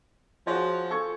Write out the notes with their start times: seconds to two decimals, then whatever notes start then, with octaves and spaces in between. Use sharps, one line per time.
0.47 F3 F#4 G#4 C#5
0.91 A4 C#6 G#6